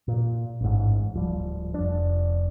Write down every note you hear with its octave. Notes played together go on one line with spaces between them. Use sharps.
A#2
A1 G#2
D1 F3 G3
F1 D4